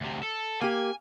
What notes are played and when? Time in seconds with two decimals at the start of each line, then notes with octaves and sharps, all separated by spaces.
0.01 D2 C3
0.23 A4
0.61 A#3 G4 G#5